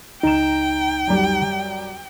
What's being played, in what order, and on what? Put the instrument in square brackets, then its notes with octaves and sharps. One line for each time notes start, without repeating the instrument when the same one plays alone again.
[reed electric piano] C#2 D#4 [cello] G5 [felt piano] A#5 E7
[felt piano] F#2 G3